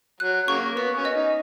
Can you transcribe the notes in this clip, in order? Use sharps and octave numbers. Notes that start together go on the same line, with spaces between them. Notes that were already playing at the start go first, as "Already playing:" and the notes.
F#3 F#6
C#3 F#3 A#3 C#6
B3 C#6
C#4
D#5
D#4